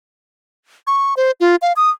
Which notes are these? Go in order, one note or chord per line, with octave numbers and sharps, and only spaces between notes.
C#6
C5
F4
F5
D#6